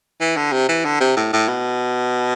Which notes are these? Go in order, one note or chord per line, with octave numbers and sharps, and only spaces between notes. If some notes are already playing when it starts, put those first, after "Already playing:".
E3
D3
C3
E3
D3
C3
A2
A2
B2